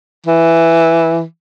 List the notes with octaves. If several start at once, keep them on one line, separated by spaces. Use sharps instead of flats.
E3